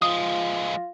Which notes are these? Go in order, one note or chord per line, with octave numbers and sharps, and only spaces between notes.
F3 G#3 F4 D#6